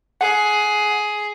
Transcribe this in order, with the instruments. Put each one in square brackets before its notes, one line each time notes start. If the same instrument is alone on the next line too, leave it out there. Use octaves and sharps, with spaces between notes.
[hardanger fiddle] G#4 [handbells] F#5